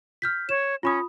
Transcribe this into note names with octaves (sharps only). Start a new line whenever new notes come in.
F6 G6 B6
C#5 E7
C#4 F4 B5 D#6